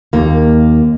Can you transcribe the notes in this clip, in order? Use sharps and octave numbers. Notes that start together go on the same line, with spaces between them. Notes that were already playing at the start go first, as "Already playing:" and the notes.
D#2 A#3